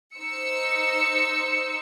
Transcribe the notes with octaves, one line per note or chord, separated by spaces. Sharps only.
D#4 C5 E6 C#7